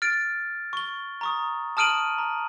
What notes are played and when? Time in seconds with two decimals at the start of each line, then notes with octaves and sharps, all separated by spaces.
0.02 F6 A6 D7
0.73 C#6 G7
1.21 A#5 C#6 D#6
1.77 A5 D#6 F6 D7 D#7 F#7
2.18 A#5